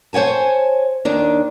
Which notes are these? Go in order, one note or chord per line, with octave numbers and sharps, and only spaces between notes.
C5 C#5 F#5 G#5 A5
D#2 D#3 D4